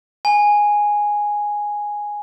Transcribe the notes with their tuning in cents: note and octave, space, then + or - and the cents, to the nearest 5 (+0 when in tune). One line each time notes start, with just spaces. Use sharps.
G#5 -5